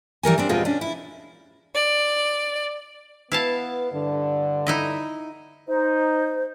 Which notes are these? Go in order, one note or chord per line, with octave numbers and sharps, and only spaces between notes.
E3 G3 A#4 G#5
G3 C4 D4
E2 B2 G#3 C4 F4
C#4 D4
E4
D5
B3 E4 B4 F5 A5
G2 D3
D#4 E4 D#5
D#4 C5